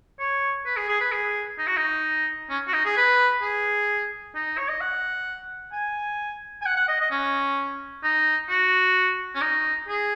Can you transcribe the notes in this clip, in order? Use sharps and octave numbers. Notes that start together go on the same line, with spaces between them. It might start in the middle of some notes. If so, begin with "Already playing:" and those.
C#5
B4
G#4
G#4
B4
G#4
D#4
F#4
D#4
C#4
F#4
D#4
G#4
B4
G#4
D#4
C#5
D#5
F#5
G#5
G#5
F#5
F#5
D#5
D#5
C#4
D#4
F#4
C#4
D#4
G#4